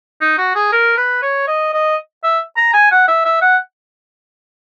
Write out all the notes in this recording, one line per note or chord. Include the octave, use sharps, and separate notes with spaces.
D#4
F#4
G#4
A#4
B4
C#5
D#5
D#5
E5
A#5
G#5
F#5
E5
E5
F#5